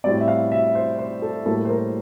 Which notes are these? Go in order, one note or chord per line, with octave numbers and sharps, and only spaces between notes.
A2 G3 C4 D5
E5
F5
E5
C5
C5
A4
A2 G3 A#3 A4
C5
A#4